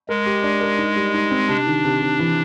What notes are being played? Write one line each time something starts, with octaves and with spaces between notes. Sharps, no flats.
G#3 A#4
G4
D4
A#4
D#4
G3
D#4
C4
C3 D4
D#3
C3
C3
E3